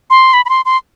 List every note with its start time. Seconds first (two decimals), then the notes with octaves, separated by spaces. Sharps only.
0.10 C6
0.33 B5
0.45 B5
0.49 C6
0.65 C6